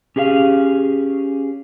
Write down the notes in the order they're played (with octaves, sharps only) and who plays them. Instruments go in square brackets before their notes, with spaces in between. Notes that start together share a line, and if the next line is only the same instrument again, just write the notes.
[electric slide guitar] C#4 G4 G#4 D#5 F5